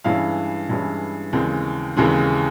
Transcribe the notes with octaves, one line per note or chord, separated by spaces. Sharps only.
G2 E3 G#3 C#4 E4 F5
G2 E3 G#3 C#4 E4
D#2 C#3 E3 G#3 C4
D#2 C#3 E3 G#3 C4